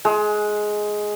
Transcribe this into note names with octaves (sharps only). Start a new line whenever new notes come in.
G#3